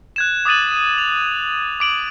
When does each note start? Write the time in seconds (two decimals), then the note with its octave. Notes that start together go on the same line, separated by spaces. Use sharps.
0.16 F#6 G#6 E7
0.45 D6 D#6 F#6 A6 D#7 F#7
0.98 F7
1.80 D6 D7 F#7